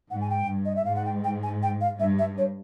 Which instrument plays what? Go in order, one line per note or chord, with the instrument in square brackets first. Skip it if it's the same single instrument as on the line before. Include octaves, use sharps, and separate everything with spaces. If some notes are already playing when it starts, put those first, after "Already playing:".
[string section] G#2 [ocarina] F#5
[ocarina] G#5
G5
[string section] G2
[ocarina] D#5
E5
[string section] G#2 [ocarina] F5
[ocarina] F#5
G5
G5
G#5
G5
F5
[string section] G2 [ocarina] E5
[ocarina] E5
C#5